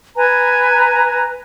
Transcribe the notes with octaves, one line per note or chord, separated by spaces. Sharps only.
B4 G#5 A#5